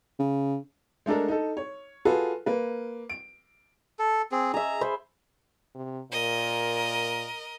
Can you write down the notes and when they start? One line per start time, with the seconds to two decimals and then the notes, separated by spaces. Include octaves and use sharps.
0.19 C#3
1.06 G#3 A3 D4 A4 A#4
1.28 D#4 A4
1.57 C#5
2.05 F4 F#4 G#4 A4 B4
2.46 A#3 B4
3.10 D7
3.99 A4
4.32 C4 G#4
4.54 G#4 E5 A#5
4.81 C5 B5
5.75 C3
6.12 A#2 A#4 D#5